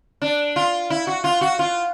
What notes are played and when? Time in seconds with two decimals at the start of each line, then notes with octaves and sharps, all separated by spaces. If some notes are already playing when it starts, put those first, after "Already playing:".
0.22 D4
0.56 F4
0.90 E4
1.07 F#4
1.24 F4
1.41 F#4
1.59 F4